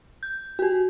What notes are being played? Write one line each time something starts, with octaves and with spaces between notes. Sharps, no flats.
G6
F#4 G4